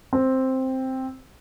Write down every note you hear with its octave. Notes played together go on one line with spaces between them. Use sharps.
C4